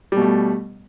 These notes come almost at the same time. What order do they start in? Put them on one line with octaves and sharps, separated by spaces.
G3 B2 A3